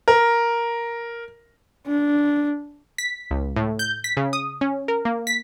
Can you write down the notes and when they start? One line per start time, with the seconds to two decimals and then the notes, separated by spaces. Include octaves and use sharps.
0.08 A#4
1.87 D4
2.98 B6
3.31 C#2
3.56 A2
3.79 G6
4.04 B6
4.17 C#3
4.33 D#6
4.61 C#4
4.88 A#4
5.05 A#3
5.27 B6